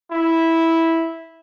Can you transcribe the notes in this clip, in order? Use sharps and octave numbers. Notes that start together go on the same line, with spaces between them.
E4